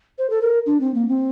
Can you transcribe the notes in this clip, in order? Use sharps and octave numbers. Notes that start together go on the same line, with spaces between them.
C5
A4
A#4
D4
C4
A#3
C4